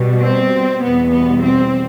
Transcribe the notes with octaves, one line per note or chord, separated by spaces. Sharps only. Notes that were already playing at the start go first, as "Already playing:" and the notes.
Already playing: B2 G3
C4
E2 B2 G3 B3
B3
C4